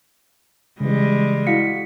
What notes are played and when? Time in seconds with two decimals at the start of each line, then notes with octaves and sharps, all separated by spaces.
0.80 C#3 E3 G3 G#3
1.47 E4 F#4 F5 B6 C#7